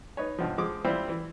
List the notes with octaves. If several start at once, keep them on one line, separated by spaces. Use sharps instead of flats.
D#4 B4 C#5
G2 B2 F3
F3 G#3 D6 D#6
G3 C4 E4 F4 C5
E3